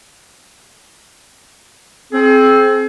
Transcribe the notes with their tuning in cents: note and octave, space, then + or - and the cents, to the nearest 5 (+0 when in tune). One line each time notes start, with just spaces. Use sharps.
C4 +10 G#4 +35